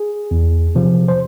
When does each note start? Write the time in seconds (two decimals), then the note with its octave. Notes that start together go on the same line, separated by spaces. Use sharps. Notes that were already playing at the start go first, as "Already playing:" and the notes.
Already playing: G#4
0.31 E2
0.75 C3 F3
1.08 C5